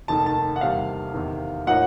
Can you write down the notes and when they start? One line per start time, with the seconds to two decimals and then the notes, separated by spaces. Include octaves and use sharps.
0.08 F1 D#2 D#3 A5
0.26 A5
0.56 F#5
0.61 E2 C3 D#3 G3 A#3 F5
1.14 E2 C3 D#3
1.67 A2 F3 A#3 D#4 F#5